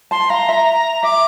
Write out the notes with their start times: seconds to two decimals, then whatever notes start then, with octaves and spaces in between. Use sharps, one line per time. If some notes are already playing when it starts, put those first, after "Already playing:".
0.11 A5 C6
0.30 F5 A#5
0.49 E5
1.03 E5 D6